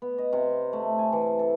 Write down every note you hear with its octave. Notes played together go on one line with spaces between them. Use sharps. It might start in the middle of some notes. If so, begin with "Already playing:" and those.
B3
D#5
C3
A3
G#5
E3
A4